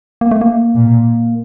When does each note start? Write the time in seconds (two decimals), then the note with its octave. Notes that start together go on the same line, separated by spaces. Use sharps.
0.21 A#3
0.31 A3
0.41 A#3
0.76 A#2